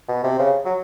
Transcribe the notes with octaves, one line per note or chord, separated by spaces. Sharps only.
B2
C3
C#3
F#3